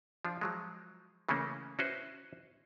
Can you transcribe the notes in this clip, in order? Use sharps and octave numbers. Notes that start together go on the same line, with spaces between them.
F3 D4 F4
F3 F#3 G#3
C#3 E3 A3 A#3 C#4
C#4 E4 F#4 B4 C5